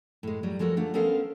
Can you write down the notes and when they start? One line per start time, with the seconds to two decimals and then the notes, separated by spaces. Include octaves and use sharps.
0.23 A2 G#3
0.43 F#3 G3
0.59 F3 G#3 F#4 A4 A#4
0.77 D3 E3 A3 F4 F#5
0.94 B3 C#4 A4 A#4 C5 F5